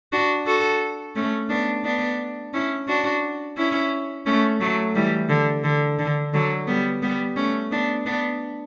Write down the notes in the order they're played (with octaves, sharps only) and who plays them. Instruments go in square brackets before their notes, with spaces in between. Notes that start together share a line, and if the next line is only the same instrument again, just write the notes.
[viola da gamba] D4 F#4
F#4 A4
A3 C#4
B3 D4
B3 D4
C#4 E4
D4 F#4
C#4 E4
A3 C#4
F#3 A3
E3 G3
D3
D3
D3
D3 F#3
G3 B3
G3 B3
A3 C#4
B3 D4
B3 D4